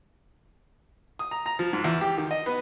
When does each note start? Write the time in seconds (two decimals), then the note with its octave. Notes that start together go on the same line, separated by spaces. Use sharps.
1.19 D#6
1.31 A#5
1.46 A#5
1.59 F3
1.73 G#2
1.84 E2
2.01 G4
2.18 D#3
2.31 D#5
2.46 B3